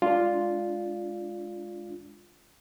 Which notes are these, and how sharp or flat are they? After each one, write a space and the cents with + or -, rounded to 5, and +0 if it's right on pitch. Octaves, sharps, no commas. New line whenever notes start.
G#3 +0 D4 +0 F4 +0